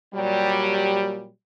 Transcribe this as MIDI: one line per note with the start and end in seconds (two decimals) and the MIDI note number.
0.14 1.28 46
0.14 1.28 54
0.14 1.28 55